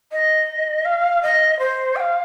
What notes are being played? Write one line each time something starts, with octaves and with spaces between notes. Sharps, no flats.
D#5
F5
D#5
C5
G5
F5